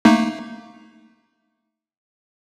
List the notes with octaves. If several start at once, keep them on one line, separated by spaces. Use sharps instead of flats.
A3 A#3 D#4